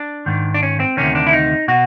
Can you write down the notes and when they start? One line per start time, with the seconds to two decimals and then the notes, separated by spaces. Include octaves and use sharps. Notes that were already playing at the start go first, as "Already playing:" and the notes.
Already playing: D4
0.26 G#2 D#3
0.54 D4
0.63 C#4
0.80 C4
0.97 D2 C3 D#3 C#4
1.15 D4
1.27 E4
1.33 D#4
1.68 B2 F#4